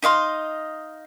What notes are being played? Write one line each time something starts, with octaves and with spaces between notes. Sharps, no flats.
D#4 D#5 F5 C6